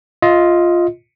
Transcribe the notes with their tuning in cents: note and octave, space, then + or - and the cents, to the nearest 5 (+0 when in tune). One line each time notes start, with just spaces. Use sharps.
F4 +0 D#5 +20